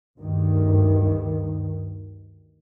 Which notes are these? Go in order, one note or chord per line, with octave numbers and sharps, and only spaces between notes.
D2 G2 D#3